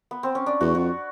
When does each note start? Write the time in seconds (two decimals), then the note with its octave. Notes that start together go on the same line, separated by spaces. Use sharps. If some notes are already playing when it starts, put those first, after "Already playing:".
0.11 B3
0.23 C4
0.35 C#4
0.46 D4
0.61 E2 F#4
0.75 F2 F#4